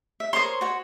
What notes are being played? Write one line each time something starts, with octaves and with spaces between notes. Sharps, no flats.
E5
A#4 C5 C#5 C6 D#6
F#4 C#5